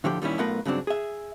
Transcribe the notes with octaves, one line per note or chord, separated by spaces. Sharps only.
A2 D3 F3 G4
A#2 D#3 G3 C#4 E4
B1 A3 B3 F4 A#4 B4
G2 C#3 F#3 C4 D4
G#4 E5